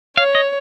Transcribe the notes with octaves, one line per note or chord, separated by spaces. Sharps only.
C#5 F5
D#5